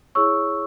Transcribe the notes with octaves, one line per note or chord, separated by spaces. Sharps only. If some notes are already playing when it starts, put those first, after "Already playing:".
E4 G#4 C#5 C#6 E6